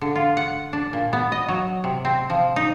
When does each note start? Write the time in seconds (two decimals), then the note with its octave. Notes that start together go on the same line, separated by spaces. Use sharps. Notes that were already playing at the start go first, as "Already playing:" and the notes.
0.01 D3
0.15 F4
0.37 F#5
0.73 D4
0.93 A#2
1.13 B3
1.32 D#5
1.48 F#3
1.84 C3
2.05 C4
2.30 F3
2.56 D#4